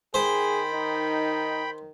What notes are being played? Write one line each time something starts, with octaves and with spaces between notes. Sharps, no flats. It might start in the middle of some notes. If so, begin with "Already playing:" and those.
D#3 G#4 C5 G5 B5
D#4